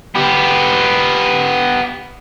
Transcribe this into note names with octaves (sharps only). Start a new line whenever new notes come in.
B3 G4